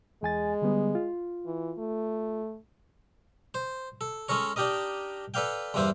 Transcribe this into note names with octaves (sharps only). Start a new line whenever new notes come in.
E2 G#3 G#5 A6
D3 G3 B3
F4
E3
A3
C5
A4
G#3 C#4 A4 A#4 C#5
D4 D#4 G4 A#4 D#5
A4 B4 D5 F5 G5
E2 G2 E3 A#3 E4 C5